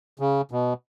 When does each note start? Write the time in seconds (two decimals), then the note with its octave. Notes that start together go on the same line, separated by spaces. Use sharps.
0.19 C#3
0.51 B2